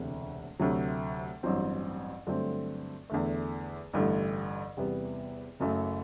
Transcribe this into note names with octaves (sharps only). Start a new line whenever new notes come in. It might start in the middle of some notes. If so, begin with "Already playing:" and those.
Already playing: E1 D2 C3
D2 C3 F#3
A1 G2 F#3 C4
G2 D3 F#3 A3 C4
E2 D3 A3
A1 G2 D3 A3
E2 C3 G3 B3
F#1 F#2 F#3 A3